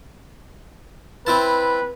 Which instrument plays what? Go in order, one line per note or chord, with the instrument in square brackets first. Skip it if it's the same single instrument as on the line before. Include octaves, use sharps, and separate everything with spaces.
[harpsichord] C4 E4 A5 [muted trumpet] B4